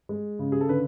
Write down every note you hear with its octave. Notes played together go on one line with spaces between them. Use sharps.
G#3
C#3
G#4
A4
D3 B4